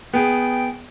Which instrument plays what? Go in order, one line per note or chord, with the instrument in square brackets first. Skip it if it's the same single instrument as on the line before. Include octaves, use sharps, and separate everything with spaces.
[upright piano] B3 G#4 [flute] G5